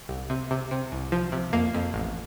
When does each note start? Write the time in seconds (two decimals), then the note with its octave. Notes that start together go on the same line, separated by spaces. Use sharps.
0.09 C2
0.30 C3
0.51 C3
0.71 C3
0.92 C2
1.12 F3
1.32 C3
1.53 F2 A#3
1.74 F2
1.94 A1